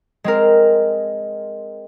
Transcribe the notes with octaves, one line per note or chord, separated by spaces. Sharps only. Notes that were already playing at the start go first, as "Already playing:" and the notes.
G#3 C4 A#4